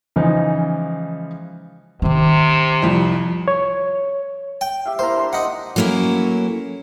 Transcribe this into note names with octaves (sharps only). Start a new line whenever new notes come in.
C#3 E3 F3 G#3 D#4
C3 D#3 C#4
C2 F2
C#5
G5
G4 E5 F5
A#3 E4 C5 A#5
D4 C6
D#4 F#5
F#3 A3 A#3 C#4 E4